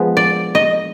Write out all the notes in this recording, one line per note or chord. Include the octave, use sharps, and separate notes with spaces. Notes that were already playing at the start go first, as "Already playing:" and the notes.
Already playing: F3 G#3 B3
D5
D#5